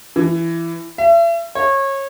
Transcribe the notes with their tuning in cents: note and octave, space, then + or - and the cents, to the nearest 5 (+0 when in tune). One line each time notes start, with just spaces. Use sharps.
E3 +20
E5 +40
C#5 -25